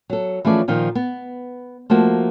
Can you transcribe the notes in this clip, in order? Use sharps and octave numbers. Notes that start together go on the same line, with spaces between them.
F#3 A4
E3 F3 A3 C#4 G#4 D5
A#2 D#3 F3 D#4
B3
F3 A3 A#3 F#4